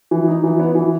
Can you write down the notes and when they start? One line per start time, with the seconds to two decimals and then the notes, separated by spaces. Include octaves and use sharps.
0.11 E3
0.28 D#4
0.44 E3
0.60 B3
0.75 E3